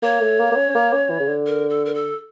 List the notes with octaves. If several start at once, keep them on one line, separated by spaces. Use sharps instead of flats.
A#3 C#5
A3
A#3
A#3
C#4
C#4
A#3
C#4
E3
C#3
D3
A#4
A4
A#4
A4